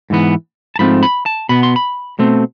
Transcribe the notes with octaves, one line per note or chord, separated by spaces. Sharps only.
G#2 E3 B3
A5
G#2 F3 A3 C4 B5
B5
A5
B2 B3 B5
C6
B5
B2 A3 C4